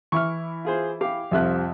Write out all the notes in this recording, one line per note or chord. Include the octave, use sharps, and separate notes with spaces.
E3 E4 C#6 F6
F4 G#4 C5
G4 F5 D6
C2 F2 C3 F3 E5 F#6